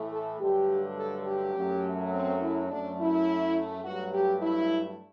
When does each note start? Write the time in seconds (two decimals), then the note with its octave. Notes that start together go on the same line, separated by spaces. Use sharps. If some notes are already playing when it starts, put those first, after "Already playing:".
Already playing: A2 E3 A3
0.13 A4
0.40 G2 D3 F#3 A3 G4
0.98 A4
1.27 G4
1.56 F#2 F#3 A3
2.13 C4
2.41 E4
2.70 F#2 F#3 A3 D4
2.99 E4
3.84 G2 F#3 A3 F#4
4.13 G4
4.42 E4